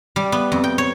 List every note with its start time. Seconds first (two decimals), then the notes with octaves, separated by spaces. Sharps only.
0.16 G3
0.32 B3
0.52 F2
0.64 G5
0.78 C#5